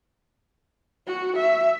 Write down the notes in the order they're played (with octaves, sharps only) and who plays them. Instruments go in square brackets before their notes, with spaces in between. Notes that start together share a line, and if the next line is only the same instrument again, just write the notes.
[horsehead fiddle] F#4
E5